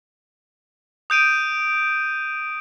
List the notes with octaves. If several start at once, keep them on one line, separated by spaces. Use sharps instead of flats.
D#6 G6 D7 D#7